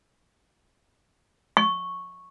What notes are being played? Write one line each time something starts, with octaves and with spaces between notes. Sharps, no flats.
C#6